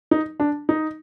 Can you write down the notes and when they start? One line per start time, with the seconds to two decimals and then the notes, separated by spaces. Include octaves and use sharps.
0.11 D#4
0.40 D4
0.69 D#4